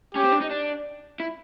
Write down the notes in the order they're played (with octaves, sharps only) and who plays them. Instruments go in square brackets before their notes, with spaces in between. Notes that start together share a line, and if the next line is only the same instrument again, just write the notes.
[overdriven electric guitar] C#4 [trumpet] G4
[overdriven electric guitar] C4
D4
D#4
D4
E4